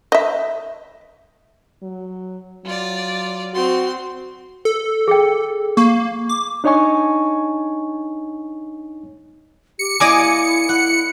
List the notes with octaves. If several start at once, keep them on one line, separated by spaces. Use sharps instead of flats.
D#5 E5
F#3
F#3 F4 D5
C4 F#4 C6
A4
G#4 G5
A#3 C#6
D6
D4 D#4 C#5 D#5 G#5 C#6
G4 C#7
A#3 E4 D5 D#5 G#5 D6 D#6
E4 F#5